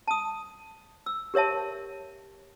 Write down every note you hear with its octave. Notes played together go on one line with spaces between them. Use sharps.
A5 D#6
E6
G4 A#4 C#5 E5 A5